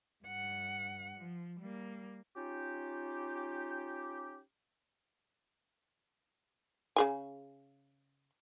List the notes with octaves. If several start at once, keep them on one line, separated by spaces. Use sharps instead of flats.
G2 F#5
F3
G3 A#3
C#4 D#4 F4 G4
C#3 G#4 G#5